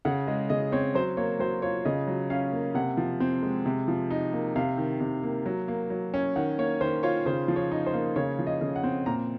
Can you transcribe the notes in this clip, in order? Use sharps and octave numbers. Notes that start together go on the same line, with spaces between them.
C#3 F#5
G#3 D#5
C#3 D#5
C4 C#5
F#3 C5
A#3 C#5
F#3 C5
F4 C#5
C#3 D#5
F#3
C#4 F5
A#3
C3 F#5
F3
C4
G#3
C3
F3
D#4
A#3
C3 F5
D#3
C3
A#3
F#3
A#3
F#3
C#4
D#3 F#5
A#3 C#5
D#3 C5
F4 C#5
C#3 C5
F3
C#5
D#4
C5
A#3
C#3 C#5
F3
D#5
C#3
F#5
C4
A#2 A#5